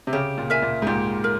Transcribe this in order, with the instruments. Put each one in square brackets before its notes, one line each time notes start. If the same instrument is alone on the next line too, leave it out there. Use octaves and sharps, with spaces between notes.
[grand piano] C3
[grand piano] C#3 [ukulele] G4
[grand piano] A#2
[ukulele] A#4 E5 G#5
[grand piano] A#2
G#2
[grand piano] A#2 [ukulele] G4
[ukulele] A#4